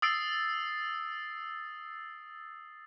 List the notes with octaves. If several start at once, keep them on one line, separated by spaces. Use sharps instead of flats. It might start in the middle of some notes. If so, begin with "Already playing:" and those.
D#6 E6 A6 C7 D7